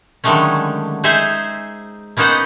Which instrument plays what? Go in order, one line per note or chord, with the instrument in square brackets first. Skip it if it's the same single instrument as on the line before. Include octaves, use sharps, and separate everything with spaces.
[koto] D3 D#3 F#3 G#3 A3 C#4
D#4 G#4 C5 E5
A#3 B3 C#4 D#4 C5 F#5